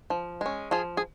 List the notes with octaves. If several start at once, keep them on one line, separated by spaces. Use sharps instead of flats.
F3
G#3 C#4
F3 F4 G#4
G#4